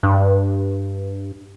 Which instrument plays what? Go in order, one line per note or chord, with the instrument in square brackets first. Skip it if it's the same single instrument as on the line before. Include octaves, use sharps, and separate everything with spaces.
[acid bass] G2